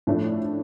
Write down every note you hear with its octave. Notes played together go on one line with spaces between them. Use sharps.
A2 F3 A3 D4